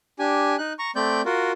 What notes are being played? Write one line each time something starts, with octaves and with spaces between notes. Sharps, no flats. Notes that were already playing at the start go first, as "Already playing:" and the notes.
D4 G4 G#5
D#4 F#6
A#5 C#6
A3 C4 D5 G6
F4 F#4 A#4